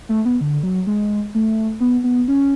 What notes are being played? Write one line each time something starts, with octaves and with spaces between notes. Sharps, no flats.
A3
B3
D3
F#3
G#3
A3
B3
B3
C#4